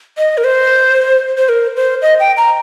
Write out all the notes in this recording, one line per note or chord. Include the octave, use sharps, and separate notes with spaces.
D#5
A#4
C5
C5
A#4
C5
D#5
G5
A#5